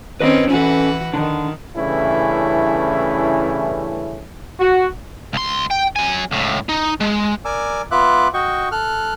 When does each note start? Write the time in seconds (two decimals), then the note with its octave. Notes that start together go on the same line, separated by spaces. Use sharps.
0.20 D#3 C4 C#4 B4 D#5
0.50 E3 C#4 F#4 A4 B4
1.14 D3 D#3
1.77 G2 C#3 E3 A3 C#4 E4
4.60 F#4
5.33 C#2 C6
5.71 G5
5.96 F#3 G#5
6.31 C#2 A2
6.69 D#4
7.00 G#3
7.45 A#4 D5 G#5 D6 E6
7.91 B3 F4 E5 D6 F#6
8.34 F#4 D#5 G5 C#6
8.72 A4 F6 F#6